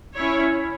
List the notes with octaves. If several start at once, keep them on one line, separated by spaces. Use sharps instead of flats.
C#4 E4 C#5